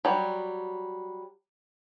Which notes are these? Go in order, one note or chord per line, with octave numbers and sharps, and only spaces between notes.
F#3 G3